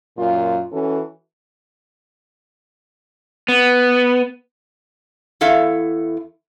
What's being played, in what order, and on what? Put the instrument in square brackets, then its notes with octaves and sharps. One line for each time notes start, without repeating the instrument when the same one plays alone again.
[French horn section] F#2 A#2 F4
E3 C#4 F#4 A4
[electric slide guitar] B3
[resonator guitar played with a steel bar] E2 E4 A4 E5 F5